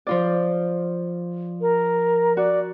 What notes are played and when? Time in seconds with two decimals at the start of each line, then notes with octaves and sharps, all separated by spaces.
0.07 F3 F4 D5
1.61 A#4
2.37 F#4 D5